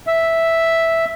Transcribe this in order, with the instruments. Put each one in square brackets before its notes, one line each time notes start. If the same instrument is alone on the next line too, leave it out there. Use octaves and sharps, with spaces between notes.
[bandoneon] E5